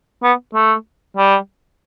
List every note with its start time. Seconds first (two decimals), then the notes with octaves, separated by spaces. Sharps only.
0.23 B3
0.54 A3
1.17 G3